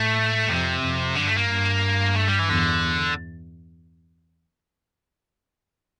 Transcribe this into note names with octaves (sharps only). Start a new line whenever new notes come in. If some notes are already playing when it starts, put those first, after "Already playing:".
Already playing: A2 A3
F2 C3
F2
G2 D3
A3
A#3
G2
A3
G3
E3
E2 D3